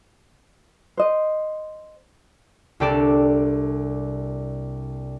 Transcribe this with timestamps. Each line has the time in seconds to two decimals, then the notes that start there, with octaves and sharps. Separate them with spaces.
0.97 C5 D#5
2.80 C2 D4 G4 A4 D5 E7